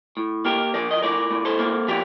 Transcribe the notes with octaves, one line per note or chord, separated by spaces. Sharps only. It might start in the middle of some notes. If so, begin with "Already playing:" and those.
A2
A#3 G4 A#4
F3 A#4 D5
D#5
A2 A#4 D5
A2
A4 C5
A#3
F3 G4 A#4